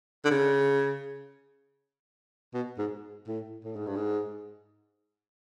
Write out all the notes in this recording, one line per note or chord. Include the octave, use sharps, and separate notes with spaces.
D3
C#3
B2
G#2
A2
A2
G#2
G2
G#2